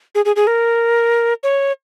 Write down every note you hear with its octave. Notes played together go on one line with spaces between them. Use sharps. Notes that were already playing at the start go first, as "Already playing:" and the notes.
G#4
G#4
G#4
A#4
C#5